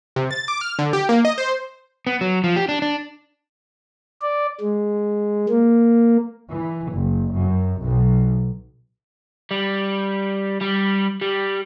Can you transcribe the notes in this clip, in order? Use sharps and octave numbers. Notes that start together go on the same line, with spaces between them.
C3
A6
D6
F6
D3
G4
A#3
D#5
C5
B3
F#3
F3
G4
D4
D4
D5
G#3
A#3
E3
F#1
F#2
B1
G3
G3
G3